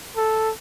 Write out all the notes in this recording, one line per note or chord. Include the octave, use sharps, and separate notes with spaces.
A4